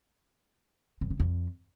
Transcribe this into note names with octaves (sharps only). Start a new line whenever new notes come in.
F#2
C#3
F2